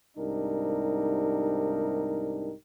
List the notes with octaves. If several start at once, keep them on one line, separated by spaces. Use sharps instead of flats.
C2 G#2 D4 D#4 G4 A#4